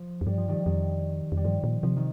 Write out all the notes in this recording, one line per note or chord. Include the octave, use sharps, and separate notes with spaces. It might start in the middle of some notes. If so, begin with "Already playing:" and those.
Already playing: F3
F2
G2 G3
F3
D#3 G3
F2 D#3 G3
F2
G3
G2 F3
A#2
C3 F3
D#3